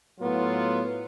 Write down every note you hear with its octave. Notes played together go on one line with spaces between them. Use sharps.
A2 F#3 B3 F4